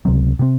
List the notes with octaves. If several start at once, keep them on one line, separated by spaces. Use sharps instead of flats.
C#2 C3 F#3 C4
C3 F#3 C4